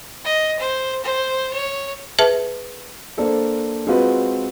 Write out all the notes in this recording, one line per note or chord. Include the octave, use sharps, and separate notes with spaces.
D#5
C5
C5
C#5
G#4 B4 E5 A5
A#3 D4 A4 C5
G#3 C4 F4 F#4 B4